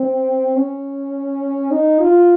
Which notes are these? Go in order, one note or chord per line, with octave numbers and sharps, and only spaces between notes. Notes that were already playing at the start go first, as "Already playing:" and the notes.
Already playing: C4
C#4
D#4
F4